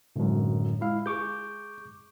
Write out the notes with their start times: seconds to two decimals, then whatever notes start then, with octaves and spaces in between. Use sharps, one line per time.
0.16 G#1 F#2 A2 D3
0.81 G#3 E4 F5
1.06 G#3 C#6 D6 G6